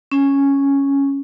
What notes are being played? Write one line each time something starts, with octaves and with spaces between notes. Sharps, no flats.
C#4